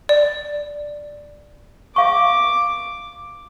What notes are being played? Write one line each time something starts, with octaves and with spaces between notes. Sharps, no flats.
D5
E5 F5 C#6 D6